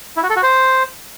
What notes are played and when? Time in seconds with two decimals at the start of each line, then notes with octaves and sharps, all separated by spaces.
0.17 E4
0.23 F#4
0.30 A4
0.36 F#4
0.43 C5